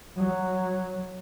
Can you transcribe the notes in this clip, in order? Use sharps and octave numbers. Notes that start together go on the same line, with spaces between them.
F#3